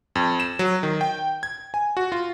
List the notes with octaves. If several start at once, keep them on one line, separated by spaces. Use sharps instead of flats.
F2
E7
F#3
D#3
G5
G#6
G#5
F#4
F4